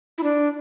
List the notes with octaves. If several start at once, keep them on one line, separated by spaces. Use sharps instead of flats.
E4
D4